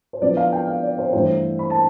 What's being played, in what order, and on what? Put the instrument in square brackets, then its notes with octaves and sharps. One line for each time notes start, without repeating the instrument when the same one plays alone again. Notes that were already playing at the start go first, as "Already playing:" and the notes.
[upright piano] C5
D3 F3 B3 E4 D5
F5
G5
F5
D5
C5
G2 E3 A3 E4 C5
B5
A5